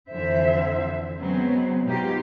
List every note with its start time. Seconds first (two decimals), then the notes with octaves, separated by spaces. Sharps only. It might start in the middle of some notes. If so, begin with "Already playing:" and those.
0.11 F2 D3 E3 F3 C5 E5
1.19 C#3 F#3 G#3 B3 C4
1.84 B2 G#3 D#4 F4 G4